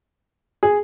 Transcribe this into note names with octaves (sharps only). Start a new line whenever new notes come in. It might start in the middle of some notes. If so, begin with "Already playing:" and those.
G#4